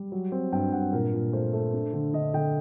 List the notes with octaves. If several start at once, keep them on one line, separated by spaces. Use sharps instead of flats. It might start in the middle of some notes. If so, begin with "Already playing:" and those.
Already playing: G3
F#3
C4
G2 G5
G2 F#5
A#2 A#4
A#2
A3 C5
A3
D4
D3
D3 D#5
D3 G5